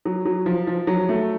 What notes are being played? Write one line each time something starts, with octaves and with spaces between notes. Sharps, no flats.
F#3
F#3
F3
F3
F#3
A3